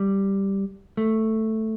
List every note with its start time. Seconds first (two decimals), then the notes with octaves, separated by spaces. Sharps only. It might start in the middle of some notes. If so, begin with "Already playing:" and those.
Already playing: G3
0.97 A3